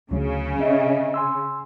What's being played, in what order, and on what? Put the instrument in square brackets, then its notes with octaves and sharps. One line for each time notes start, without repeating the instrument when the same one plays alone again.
[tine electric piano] D2 F#3 [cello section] C#3
[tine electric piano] C#4 D#5 E5
G#5 C6 E6